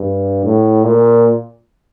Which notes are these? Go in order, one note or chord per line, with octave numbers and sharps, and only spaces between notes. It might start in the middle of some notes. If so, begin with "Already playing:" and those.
Already playing: G2
A2
A#2